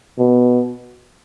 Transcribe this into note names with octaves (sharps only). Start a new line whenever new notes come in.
B2